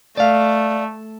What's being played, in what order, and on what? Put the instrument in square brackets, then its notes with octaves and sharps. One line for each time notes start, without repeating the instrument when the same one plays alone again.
[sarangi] A3 [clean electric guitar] D5 F5